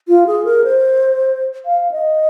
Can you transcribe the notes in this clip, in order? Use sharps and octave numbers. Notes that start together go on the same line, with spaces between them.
F4
G#4
A#4
C5
F5
D#5